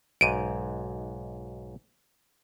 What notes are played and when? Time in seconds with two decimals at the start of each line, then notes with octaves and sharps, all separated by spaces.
0.21 B1 G#2 D7 D#7